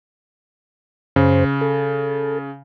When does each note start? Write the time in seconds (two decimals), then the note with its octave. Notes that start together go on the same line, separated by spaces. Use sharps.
1.16 F#2 C#3 C5
1.61 A4